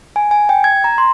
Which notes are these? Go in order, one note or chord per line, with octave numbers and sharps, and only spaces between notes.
G#5
G#5
G5
G#6
A#5
C6